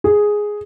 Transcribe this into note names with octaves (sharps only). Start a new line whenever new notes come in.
G#4